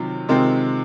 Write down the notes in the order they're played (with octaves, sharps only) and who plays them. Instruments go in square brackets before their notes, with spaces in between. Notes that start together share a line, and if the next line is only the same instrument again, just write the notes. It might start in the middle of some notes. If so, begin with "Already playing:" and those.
Already playing: [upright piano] C3 D#3 F#3 C4 F4
C3 D#3 G#3 C4 F4